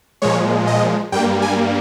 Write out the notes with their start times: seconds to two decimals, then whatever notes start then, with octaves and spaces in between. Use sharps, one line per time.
0.22 A#2 F3 G#3 C#5
0.67 D#5
1.12 G2 G3 A#3 G5
1.42 G#5